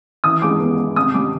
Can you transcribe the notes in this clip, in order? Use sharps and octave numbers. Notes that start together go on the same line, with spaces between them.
E3 D#6
G#3 D6
B3
B3
C3 D#6
G3 D6